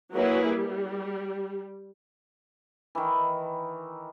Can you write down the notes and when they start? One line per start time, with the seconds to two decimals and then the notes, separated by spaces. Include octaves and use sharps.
0.16 F#3 A#3 E4 G#4 B4
0.50 G3
2.95 D#3 E3